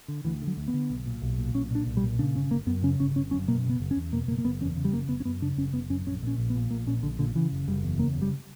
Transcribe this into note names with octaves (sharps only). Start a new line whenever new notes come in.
D3
D2 E3
D3
F#3
D2
B3
D3
B1
A#2
B1
A#2
B1 C#4
A#2 D4
B1
G3
A#2
C#3 D4
G1 C#4
G1 A#3
F#2 B3
C#3 C#4
G1 C#4
G1 C#4
F#2 C#4
B2 A#3
F#1 B3
F#1
C#4
E2
B2 A#3
F#1 A#3
A#3
F#1 B3
E2 C#4
C#3
G3
F#1 A#3
F#1 B3
C#4
F#2 B3
C#3 D4
F#1 C#4
F#1 B3
F#2 C#4
A#1 C#4
A#2 C#4
A#1
B3
A#2
A#1 A#3
A#2 C#4
A#1 D3
A#2 D3
C#3 E3
F#1
F#1 G3
E2
C#3 A#3
F#1
G3